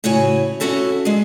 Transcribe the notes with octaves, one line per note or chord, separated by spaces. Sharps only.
A2 C#3 E4 F#4 C#5 G#5
C#4 D4 E4 F#4 A4 E5
G#3 G#4